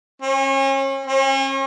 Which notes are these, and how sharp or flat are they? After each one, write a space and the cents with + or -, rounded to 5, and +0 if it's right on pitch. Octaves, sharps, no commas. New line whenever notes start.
C#4 -35
C#4 -40